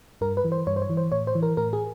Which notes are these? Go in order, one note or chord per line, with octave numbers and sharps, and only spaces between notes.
G2 A#4
B4
E3
C5
G2 C#5
C5
C#5
E3
C5
A2 C#5
C5
E3
A#4
A2 A#4
G#4